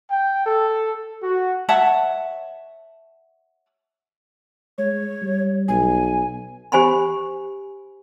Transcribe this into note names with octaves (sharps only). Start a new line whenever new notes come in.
G5
A4
F#4
C#5 E5 F#5 A5
G#3 C#5
G3
B1 G#5
G4 C5 G#5 B5 C6